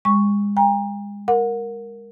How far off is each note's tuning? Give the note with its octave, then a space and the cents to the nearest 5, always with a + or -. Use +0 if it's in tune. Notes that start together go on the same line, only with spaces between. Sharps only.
G#3 -30 C#6 +0
G5 +45 A#5 +20
A#4 +0 F#5 -25